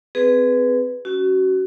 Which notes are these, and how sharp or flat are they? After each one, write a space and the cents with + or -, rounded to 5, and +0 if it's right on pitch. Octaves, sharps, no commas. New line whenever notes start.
C4 -25 G#4 +0 B4 +0
C#4 +0 F#4 +25